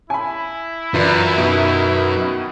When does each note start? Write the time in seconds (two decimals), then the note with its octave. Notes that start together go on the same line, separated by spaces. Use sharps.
0.10 E4 G#5 B5
0.94 F#2 E3 F4 F#4 B4 D5 B5
1.38 B2 D#3 F#4 E5